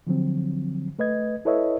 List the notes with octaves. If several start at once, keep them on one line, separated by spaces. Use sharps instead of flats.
D3 F3 F#3 C4
A3 B4 D#5 G#6
E4 A4 B4 C#5 D#5 E5